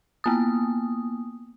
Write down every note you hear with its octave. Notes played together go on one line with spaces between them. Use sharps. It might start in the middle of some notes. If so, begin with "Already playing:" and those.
A#3 B3 D#6